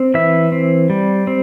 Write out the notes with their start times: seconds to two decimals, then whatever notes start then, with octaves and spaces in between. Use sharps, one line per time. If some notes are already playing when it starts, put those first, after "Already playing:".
Already playing: C4
0.14 E3 E5
0.52 C4
0.90 G3
1.27 C4